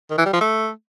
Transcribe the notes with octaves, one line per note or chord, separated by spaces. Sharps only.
D#3
E3
G3
F3
A3